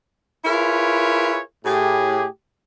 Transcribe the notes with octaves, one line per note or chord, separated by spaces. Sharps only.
E4 F4 G#4 A#4 B4 C#5
A2 G4 G#4